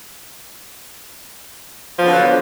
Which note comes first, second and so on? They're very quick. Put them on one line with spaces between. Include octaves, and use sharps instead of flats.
F3 B3 D3 F#3